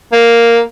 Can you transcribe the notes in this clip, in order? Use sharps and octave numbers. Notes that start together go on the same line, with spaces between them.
A#3